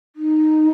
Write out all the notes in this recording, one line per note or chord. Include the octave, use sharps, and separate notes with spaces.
D#4